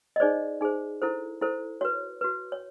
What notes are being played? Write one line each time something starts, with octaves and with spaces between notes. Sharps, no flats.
D#5
D#4 G#4 C5 D5
D#4 G#4 C5
E4 A4 C5
E4 A4 C5
F#4 B4 C#5
F#4 B4
C#5